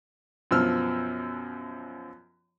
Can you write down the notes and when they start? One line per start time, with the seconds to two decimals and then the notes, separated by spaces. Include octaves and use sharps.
0.51 F#2 B2 F3 E6 F6